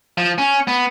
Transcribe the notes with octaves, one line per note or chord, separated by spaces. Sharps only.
F3
C#4
B3